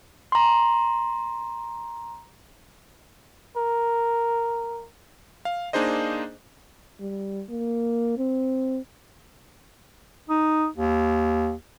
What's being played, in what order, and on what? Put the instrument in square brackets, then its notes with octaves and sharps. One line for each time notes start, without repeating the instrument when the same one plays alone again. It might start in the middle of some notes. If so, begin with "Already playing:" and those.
[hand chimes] A#5 C6
[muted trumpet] A#4
[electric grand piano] F5
A#3 D4 D#4 G#4 C5 D#5
[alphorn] G3
A#3
C4
[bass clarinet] D#4
D#2